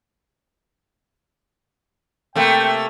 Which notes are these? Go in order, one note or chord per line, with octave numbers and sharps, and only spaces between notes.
C3 A3 A#3 G5